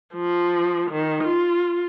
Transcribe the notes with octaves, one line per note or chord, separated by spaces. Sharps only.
F3
D#3
F4